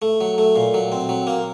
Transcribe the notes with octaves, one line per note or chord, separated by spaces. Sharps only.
A3
F#3
A3
A#2
F#3
C4
F#3
A#3